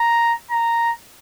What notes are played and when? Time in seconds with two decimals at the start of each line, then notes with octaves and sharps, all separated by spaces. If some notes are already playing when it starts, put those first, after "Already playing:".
Already playing: A#5
0.51 A#5